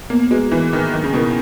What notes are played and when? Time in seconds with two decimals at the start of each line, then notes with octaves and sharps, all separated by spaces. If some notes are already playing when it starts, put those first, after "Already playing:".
0.10 A#3 B3
0.31 G#3 F#4 B4
0.51 E3 B3
0.72 D#3 F#4 B4
0.93 D#3 F#3
1.04 C#3
1.13 B2 C#4 E4 A#4